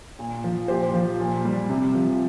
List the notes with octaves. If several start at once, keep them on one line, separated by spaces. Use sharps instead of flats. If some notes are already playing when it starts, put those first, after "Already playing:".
A#2
F3
A#2 G4 C5
F3
A#2
G3
C3
F3